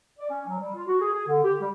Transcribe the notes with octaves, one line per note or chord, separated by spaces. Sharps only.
D5
C#4
F#3
G3
F4
F#4
G#4
G#4
D3
G4
G3